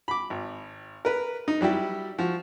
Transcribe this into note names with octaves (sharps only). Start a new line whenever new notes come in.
B5 D6
G#1
A#4 B4
D#4
F#3 G3 E4 G4
F3 F#4